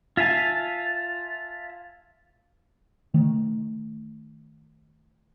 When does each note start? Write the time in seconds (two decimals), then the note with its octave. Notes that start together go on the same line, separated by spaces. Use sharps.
0.17 F4 E5 F5 G#5 A5
3.14 D#3 A3